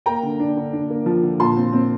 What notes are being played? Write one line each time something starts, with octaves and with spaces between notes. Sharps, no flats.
A#3 G5 A#5
D3
D4
D3
D4
A#3
F3
D3
A#2 A5 C6
C4
C4